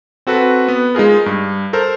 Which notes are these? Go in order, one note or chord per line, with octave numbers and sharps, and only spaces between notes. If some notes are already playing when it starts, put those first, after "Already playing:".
C4 F#4 A4 B4
B3
G#3 D#4 F4 G#4 A#4
G2
A4 A#4 C5